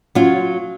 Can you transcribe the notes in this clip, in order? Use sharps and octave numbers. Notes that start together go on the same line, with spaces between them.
F#3 C#4 F4